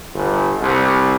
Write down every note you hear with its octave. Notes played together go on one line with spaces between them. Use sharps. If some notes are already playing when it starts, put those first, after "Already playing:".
G1
C2